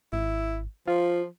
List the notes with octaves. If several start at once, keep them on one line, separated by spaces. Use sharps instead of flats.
G#1 E4
F3 F4